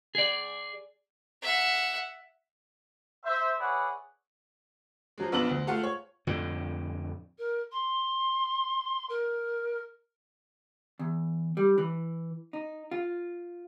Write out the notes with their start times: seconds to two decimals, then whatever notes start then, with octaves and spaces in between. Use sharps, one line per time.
0.15 G#4 D5
1.42 E5 F#5
3.25 C5 E5
3.59 E4 G#4 B4 C#5 D5 F#5
5.18 F3 F#3 G#3
5.32 A#1 B3 D4 A5 F#7
5.49 D2
5.67 G#3 A3 F4 F5 F#5
5.83 C#5
6.27 F2 A2 D3
7.38 A#4
7.72 C6
9.09 A#4
10.99 E2
11.57 G3
11.78 E3
12.53 D#4
12.91 F4